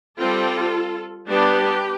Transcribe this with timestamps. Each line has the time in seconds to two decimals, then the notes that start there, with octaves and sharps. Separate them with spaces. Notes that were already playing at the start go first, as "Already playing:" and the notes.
0.20 G3 C4 F4 A4
1.29 G3 B3 D4 G4 B4